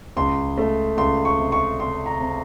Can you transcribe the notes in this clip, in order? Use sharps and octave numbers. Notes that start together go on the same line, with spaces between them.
C#2 C6
A3
C#2 C6
C#6
C3
C#6
C3 C6
A#5
C3